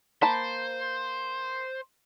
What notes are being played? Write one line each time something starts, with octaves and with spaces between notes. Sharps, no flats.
A#3 C5 A5 B5